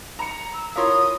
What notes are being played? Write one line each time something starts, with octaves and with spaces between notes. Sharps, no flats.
A#5 B5 C#7
E6
E4 F4 A#4 C#5 F5 C6 D#6